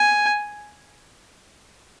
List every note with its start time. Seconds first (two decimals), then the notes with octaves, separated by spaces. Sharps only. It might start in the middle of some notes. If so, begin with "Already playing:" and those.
Already playing: G#5